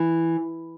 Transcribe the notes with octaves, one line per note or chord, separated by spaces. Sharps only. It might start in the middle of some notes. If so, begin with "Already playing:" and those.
Already playing: E3